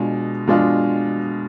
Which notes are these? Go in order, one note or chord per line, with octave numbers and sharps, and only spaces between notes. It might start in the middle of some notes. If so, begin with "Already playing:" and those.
Already playing: B2 G#3 D4 F4
B2 G#3 D4 F4